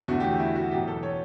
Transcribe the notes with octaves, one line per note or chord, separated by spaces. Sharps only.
E2 D3 A3 F#4
G4
F#4
E4
F#4
E2 B2 F#3 G4
A4
C#5